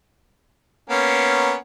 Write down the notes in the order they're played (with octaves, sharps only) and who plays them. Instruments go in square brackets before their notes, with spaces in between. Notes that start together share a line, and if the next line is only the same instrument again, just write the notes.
[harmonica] A#3 B3 C#4